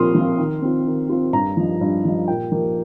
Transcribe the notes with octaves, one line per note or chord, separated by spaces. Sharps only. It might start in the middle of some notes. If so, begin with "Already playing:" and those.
Already playing: A#2 F3 C4 F4 C6 D#6 F6
F3 C4 F4
D#3
C4 F4
D#3
C4 F4
G2 A#5
F3 D#4
G2
F3 D#4
A#2 G5
F3 A#3 D#4